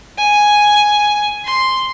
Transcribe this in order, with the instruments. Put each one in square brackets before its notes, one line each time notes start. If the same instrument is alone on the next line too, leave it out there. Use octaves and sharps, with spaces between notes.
[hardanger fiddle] G#5
C6